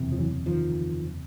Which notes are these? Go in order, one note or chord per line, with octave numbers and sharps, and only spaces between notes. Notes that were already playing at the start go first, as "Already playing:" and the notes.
Already playing: F#1 E2 C3
F3
E3 F#3
D#3 F3